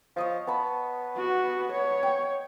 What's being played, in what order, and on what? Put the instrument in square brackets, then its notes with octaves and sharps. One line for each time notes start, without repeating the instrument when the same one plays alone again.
[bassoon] F3 [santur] C#5 D#5 D6
[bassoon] B3 [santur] A5 B5
[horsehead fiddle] F#4
C#5
[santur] G5